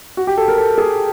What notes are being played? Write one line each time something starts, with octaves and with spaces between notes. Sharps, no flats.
F#4
G4
A4
A#4
A4
G#4